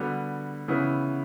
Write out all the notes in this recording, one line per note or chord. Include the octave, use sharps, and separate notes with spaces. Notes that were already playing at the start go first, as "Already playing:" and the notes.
Already playing: D3 G3 B3 F#4
C#3 E3 B3 E4